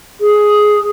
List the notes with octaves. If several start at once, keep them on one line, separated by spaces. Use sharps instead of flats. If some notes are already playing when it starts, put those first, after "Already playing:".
G#4